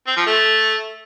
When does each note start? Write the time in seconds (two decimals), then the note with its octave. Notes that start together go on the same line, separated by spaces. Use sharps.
0.07 C4
0.17 F3
0.26 A3